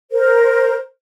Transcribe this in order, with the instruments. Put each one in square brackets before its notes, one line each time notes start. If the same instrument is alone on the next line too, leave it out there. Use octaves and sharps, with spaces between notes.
[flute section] A#4 C5